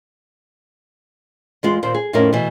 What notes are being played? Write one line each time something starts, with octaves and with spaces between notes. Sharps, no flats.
E2 G#3 F4
D#2 A#2 C5
G#4
F2 A2 C#4 D#4 E4 A#4
B2 E3